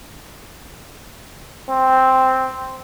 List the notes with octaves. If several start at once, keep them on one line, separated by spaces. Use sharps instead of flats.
C4